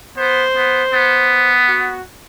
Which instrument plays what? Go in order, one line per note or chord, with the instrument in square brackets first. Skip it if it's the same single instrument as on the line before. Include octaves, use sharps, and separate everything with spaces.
[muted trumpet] B3 [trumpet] C5
[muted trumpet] B3
B3
[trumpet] F#4